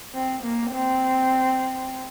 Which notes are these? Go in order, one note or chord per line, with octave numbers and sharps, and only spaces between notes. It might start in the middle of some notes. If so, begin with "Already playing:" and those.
C4
A#3
C4